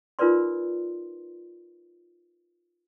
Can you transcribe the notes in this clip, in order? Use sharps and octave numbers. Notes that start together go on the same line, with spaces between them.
D#4 F4 A#4 B4 D5 C6